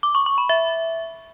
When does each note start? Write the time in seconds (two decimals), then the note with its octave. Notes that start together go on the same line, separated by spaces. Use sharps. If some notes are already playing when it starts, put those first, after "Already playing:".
0.03 D6
0.15 C#6
0.26 C#6
0.38 B5
0.49 E5